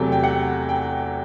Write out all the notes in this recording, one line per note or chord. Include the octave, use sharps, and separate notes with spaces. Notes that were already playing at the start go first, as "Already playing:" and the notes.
Already playing: E2 C3 F#3 A3 G5
G5
F#5
G5